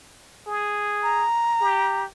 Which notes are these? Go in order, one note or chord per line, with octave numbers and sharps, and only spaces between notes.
G#4
A#5
G4